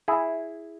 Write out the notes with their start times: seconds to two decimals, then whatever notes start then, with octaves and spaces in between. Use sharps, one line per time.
0.08 E4 G#4